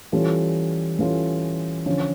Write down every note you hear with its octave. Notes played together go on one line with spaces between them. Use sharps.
E3 G3 C#4 F4 A4
E3 G3 C#4 F4 A4
D3 F3 C#4 F4